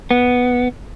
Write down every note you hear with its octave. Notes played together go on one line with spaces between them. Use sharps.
B3